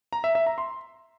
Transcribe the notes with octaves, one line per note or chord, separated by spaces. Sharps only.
A#5
E5
E5
A#5
C6